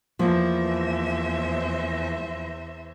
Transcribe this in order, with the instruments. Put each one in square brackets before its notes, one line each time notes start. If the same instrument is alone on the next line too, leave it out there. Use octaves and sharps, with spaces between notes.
[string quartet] E2 C5 E5 [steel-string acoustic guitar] F3 A#3